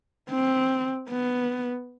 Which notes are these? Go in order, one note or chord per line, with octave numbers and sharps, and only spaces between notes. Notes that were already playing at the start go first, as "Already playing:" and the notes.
C4
B3